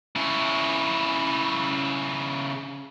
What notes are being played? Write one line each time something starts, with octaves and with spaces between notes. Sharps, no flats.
C#3 E4